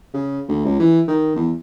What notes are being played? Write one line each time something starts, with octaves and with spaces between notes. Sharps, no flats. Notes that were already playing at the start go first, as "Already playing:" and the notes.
C#3
D2
C#2
E3
D#3
E2